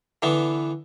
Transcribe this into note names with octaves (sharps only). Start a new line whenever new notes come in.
D3 E3 B3